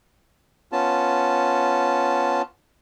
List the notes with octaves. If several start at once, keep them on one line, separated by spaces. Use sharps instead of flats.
B3 C#4 F4 A5